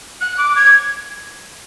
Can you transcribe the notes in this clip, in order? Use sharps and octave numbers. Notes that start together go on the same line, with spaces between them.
F#6
D6
G#6